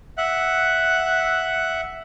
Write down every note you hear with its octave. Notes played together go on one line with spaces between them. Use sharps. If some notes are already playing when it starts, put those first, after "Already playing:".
E5 F#5 F#6